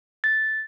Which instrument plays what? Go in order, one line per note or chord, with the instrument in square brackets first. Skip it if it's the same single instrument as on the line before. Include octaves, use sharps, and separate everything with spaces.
[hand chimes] A6